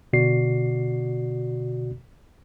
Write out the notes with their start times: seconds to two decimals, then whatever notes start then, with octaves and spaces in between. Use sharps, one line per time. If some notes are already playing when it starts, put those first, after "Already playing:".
0.13 B2 D3 F#4 D5 C7